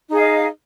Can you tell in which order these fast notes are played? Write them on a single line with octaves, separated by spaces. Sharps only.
D#4 G#4 F5 D#5